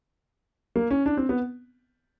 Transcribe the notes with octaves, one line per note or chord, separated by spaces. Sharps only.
A#3
C#4
D4
C4
B3